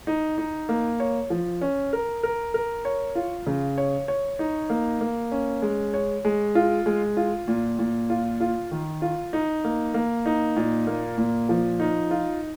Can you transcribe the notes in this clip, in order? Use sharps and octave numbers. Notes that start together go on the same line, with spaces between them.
D#4
D#4
A#3
C#5
F3
C#4
A#4
A#4
A#4
C#5
F4
C#3
C#5
C#5
D#4
A#3
A#3
C#4
G#3
C#5
G#3
F4
G#3
F4
A#2
A#2
F4
F4
D#3
F4
D#4
A#3
A#3
D#4
A#2
A#3
A#2
F3
D#4
F4